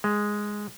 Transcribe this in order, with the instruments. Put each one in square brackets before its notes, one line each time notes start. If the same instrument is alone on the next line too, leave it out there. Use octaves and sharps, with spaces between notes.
[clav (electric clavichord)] G#3